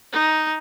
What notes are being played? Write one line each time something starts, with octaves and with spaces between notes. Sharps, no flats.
D#4